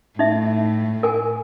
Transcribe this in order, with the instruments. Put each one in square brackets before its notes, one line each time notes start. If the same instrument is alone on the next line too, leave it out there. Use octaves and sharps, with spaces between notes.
[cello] A2 [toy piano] D#4 E5
[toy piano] A#4 G#5